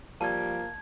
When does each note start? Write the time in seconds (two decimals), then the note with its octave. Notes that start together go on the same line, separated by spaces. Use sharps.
0.21 F3 G3 A#3 A5 G#6